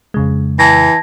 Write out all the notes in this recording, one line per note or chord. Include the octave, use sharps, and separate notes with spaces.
F2 C#3 G#3
E3 A5 G#6 A#6